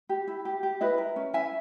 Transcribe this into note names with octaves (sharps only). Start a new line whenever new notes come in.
G4
E4
G4
G4
E4 B4 D#5
A#4
C#4
E4 E5 G#5